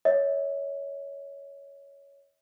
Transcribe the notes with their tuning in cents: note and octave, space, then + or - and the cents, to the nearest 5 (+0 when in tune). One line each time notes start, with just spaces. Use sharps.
C#5 +10 E5 -45